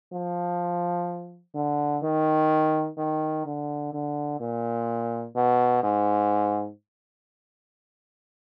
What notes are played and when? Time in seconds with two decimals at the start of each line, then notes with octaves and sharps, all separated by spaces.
0.13 F3
1.55 D3
2.03 D#3
2.98 D#3
3.46 D3
3.93 D3
4.40 A#2
5.36 B2
5.83 G#2